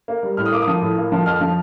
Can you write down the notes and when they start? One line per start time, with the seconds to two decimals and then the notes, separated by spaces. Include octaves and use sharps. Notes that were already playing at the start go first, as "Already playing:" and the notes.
0.08 A#3
0.23 G3
0.37 A2 F6
0.46 D#6
0.52 A#3 D6
0.62 D#6
0.67 F3
0.81 A2
0.97 A#3
1.12 F3
1.26 F2 F6
1.41 F3